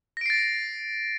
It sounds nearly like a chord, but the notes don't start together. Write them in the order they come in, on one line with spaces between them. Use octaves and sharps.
A#6 D7 C7 A6